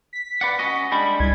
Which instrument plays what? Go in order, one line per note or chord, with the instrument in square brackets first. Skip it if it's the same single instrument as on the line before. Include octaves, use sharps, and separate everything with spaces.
[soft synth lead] B6
[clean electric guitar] B4 D5 F#5
C#4 F#4 D#5
[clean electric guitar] G3 G#3 D4 [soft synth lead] B5
[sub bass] C2 [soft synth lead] G#6